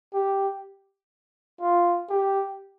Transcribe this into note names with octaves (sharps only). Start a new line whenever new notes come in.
G4
F4
G4